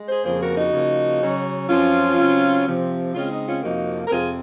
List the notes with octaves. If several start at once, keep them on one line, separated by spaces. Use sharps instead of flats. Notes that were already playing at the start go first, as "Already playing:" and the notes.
Already playing: G#3
G#4 C5
F2 C#3 F3 A#3 G#4 C5
F#4 A#4
D#4 F#4
C#3 F3 A#3
C#3 F#3 C#4
F#2 F3 C4 C#4 F4
C#3 F#3 C4
C3 F3 C4
C#3 G#3 C4 C#4 F4
D#4
C#4 F4
F2 C3 F3 A#3 D#4 F#4
A#4
F2 C3 F3 C4 F4 G#4